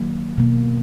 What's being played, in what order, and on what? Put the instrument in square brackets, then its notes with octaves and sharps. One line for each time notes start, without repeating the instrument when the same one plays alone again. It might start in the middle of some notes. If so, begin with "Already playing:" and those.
Already playing: [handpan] D#3 F#3 A#3
B2 A#3